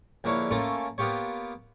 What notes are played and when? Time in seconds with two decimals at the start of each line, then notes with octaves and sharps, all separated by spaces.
0.24 A#1 D3 A#3 E4 C#5 F5
0.51 A3 A#3 C#4 F4 A4
0.98 A#3 B3 F4 G4 C#5